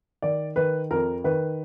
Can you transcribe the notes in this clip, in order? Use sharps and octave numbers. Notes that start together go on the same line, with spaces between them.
D#3 D5
D#3 B4
F2 A#4
D#3 B4